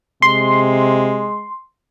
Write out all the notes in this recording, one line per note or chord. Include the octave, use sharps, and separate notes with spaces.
C3 G#3 C6